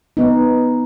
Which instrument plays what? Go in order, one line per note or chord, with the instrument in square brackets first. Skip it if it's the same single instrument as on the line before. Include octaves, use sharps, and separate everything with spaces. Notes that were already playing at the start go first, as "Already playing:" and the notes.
[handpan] B3 D#4